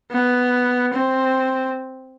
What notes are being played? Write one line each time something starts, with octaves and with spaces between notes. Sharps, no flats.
B3
C4